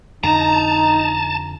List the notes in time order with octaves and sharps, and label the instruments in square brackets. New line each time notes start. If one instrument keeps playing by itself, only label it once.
[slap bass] F2 D3 [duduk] D#4 [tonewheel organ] A5 [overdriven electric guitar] A#5